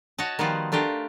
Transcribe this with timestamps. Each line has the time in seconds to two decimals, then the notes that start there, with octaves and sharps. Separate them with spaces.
0.18 F#4 C#5 D#5 A5
0.39 D#3 F3 G3 B3 F4 F#4
0.72 A3 D4 F4 G4 A#4